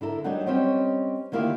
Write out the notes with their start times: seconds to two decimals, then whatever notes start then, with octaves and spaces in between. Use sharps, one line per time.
0.01 D3 E4 A4 A#4
0.24 F#3 G3 D4 D#4 F#5
0.46 G3 C4 C#4 C#5 D#5
1.32 D3 D#3 A#3 E4 F4 G4